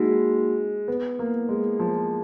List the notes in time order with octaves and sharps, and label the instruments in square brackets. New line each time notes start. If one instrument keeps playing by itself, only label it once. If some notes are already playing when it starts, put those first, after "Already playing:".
Already playing: [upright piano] G#3 [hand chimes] A#3 D#4 F#4
[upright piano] B3
A#3
G#3
F3